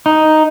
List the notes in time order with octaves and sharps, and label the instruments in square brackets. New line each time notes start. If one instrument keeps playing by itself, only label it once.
[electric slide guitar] D#4